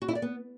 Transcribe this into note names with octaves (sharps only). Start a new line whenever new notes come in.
F#4
E4
D5
B3